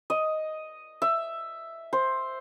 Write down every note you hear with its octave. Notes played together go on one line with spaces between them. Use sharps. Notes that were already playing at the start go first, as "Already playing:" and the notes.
D#5
E5
C5